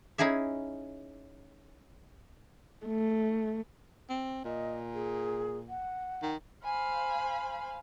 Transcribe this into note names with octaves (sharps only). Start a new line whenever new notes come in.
C#4 D#4 E4 G#4 E5
A3
C4
A#2 D#5
G#4
F#5
D#3
C5 F5 G#5 B5